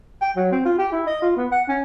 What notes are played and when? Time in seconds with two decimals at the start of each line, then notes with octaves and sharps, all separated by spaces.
0.21 G5
0.36 F#3
0.52 C4
0.65 F4
0.79 G4
0.92 E4
1.07 D#5
1.22 F4
1.37 B3
1.52 F#5
1.69 C#4